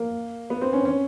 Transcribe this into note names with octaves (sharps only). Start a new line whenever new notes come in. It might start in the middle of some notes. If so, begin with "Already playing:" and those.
Already playing: A#3
B3
C4
C#4
C#4